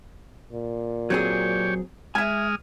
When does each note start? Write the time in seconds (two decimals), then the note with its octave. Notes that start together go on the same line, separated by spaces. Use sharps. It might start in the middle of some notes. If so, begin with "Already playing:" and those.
0.52 A#2
1.10 F#3 C4 G4 G#4 C#5
2.15 G#3 E5 G#5 D#6 F6